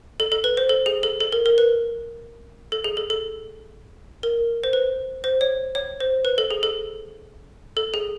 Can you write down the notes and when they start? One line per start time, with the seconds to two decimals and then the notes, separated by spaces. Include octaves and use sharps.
0.20 A4
0.32 A4
0.44 B4
0.57 C5
0.69 A4
0.86 G#4
1.03 A4
1.20 A4
1.32 A#4
1.46 A#4
1.58 B4
2.72 A4
2.84 G#4
2.97 A4
3.10 A4
4.23 A#4
4.64 C5
4.73 B4
5.24 C5
5.41 C#5
5.75 C#5
6.00 C5
6.25 B4
6.38 A4
6.51 G#4
6.63 A4
7.77 A4
7.94 G#4